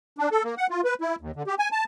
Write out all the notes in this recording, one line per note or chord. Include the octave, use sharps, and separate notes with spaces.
D4
A4
A#3
F#5
F4
B4
E4
D#2
D3
G4
G#5
A5